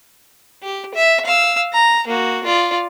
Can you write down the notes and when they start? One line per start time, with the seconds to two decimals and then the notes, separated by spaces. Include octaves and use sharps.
0.63 G4
0.94 E5
1.25 F5 E6
1.73 A#5
2.07 A#3 F#4
2.44 F4 D5